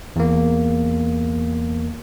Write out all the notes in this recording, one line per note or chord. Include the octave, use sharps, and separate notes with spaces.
E2 A#3